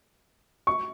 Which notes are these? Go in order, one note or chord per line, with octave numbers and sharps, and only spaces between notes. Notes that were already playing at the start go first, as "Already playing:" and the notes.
C#6